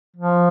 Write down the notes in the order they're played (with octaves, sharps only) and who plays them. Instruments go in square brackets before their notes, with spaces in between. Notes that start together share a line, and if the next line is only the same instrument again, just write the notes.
[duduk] F3